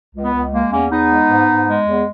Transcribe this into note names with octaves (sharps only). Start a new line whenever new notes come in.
C#2
B3
C#2
G#3 A#3
E2 A#3 C#4
E2 B3 D#4
G#3
G#2
G#2
G#3
E2